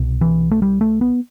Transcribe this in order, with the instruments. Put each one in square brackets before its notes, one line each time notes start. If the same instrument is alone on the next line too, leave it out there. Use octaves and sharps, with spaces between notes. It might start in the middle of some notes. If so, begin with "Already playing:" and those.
Already playing: [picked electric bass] C2 B2
E3
A3
G3
A3
B3